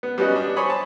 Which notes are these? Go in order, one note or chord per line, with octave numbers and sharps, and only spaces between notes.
B3
G3 B3 C#4 F#4 D#5
D4
C5 C#5 G#5 B5 D#6
A5